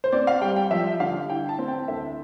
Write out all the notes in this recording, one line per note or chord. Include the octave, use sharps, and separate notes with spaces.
C5
C4 D5
F5
G3 G5
G5
F3 E5
D3 F5
E4 G5
A5
C4
G5
D2 E5